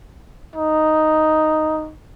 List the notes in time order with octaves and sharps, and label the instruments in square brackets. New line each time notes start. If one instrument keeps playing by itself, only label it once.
[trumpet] D#4